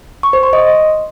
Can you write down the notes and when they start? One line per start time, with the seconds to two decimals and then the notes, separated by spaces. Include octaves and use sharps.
0.23 C#6
0.33 C5
0.43 C6
0.53 D#5